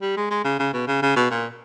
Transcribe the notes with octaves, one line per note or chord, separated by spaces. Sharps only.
G3
G#3
G#3
C#3
C#3
B2
C#3
C#3
B2
A#2